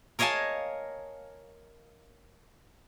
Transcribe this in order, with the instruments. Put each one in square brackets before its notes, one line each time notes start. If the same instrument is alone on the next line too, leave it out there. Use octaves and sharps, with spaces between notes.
[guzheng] A#4 C#5 D#5 F5 G#5 A5